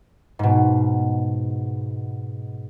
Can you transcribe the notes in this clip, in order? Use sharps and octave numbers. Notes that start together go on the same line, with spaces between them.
G#2 B2